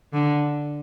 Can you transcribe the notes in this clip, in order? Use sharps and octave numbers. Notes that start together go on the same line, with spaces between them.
D3